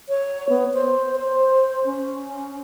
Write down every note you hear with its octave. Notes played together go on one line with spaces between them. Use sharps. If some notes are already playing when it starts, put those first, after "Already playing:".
C#5
B3
C5
C5
C#4